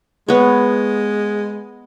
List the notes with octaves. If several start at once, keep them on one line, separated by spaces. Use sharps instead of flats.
G#3 B3 C#5